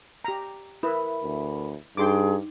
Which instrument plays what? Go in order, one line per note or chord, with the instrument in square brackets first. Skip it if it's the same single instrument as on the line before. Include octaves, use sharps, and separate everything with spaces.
[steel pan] G4 A#5
[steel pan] E4 B4 [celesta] A#4 E5 B5
[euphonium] D2
[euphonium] G2 [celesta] D#4 [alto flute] G#4 [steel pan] G5 C6 D6